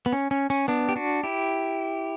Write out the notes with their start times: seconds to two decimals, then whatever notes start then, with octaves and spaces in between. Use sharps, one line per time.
0.06 B3
0.13 C#4
0.31 C#4
0.50 C#4
0.68 B3 D4
0.89 G4
0.96 D4 F#4
1.23 E4 G4